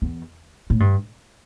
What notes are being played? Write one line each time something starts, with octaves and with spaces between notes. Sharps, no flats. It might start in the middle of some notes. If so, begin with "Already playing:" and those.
E2
A2
G2